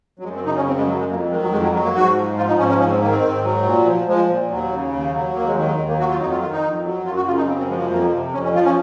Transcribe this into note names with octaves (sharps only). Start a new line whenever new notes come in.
F#3
F#2 G#3
C4
C#3 D#4
C#4
F#2 C4
G#3
F#3
G#3
F2 A#3
D#3 G#3
F#3
F2 G#3
F#3
F#3 G#3
A#3
G#2 F#4
F3
F3 F4
D#4
G#2 C#4
C#4
G#2 C#4
C4
D#3 A#3
C4
G#2
F#3
A#2
F3
F3 G#3
A#2
D#2 F#3
C#3
D#2
F#3
D#2 A#3
G#3
D#3 F#3
G#3
D#2 G#3
A#3
F#3 F#4
F4
F2 D#4
F4
D#3 F4
D#4
F2
F#3
F#2 F4
F#4
C#3 F4
D#4
F#2 C4
C4
F3 G#3
G#3
F2 A#3
C3
F2 C#4
C#4
F3 F4
C#4